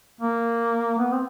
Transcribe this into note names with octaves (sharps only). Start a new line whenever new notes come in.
A#3
B3
C4